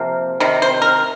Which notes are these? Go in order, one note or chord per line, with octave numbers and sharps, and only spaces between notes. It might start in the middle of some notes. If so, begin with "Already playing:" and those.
Already playing: C3 F3 A#3
C3 D#3
C5
A#4